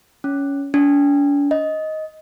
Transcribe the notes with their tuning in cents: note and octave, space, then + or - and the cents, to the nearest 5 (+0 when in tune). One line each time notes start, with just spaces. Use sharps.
C#4 +15
D4 -45
D#5 +10